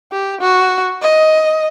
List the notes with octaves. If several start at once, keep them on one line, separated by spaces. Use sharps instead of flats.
G4
F#4
D#5